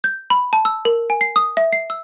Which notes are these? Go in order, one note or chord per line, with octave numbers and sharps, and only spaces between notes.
G6
B5
A5
E6
A#4
G#5
C7
D#6
E5
C7
E6